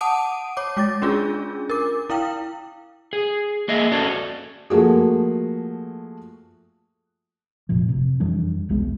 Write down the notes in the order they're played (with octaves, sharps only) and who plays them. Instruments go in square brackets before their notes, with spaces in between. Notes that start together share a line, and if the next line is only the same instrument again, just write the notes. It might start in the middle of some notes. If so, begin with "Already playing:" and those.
[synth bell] F#5 A5 D6 D#6 D7 D#7
C#5 D6
G#3 D6 A6
C#4 D4 F4 G#4
A#4 D6
E4 F5 G5
[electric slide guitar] G#4
A#3 G#4 D#5 E5
C#4 F#4 A4 C#5 D5
[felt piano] F3 A3 A#3 F#4 G#4
[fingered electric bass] F1 A#2 F3
C3
F2 E3 G3 D4
E1 C2 G#3 B3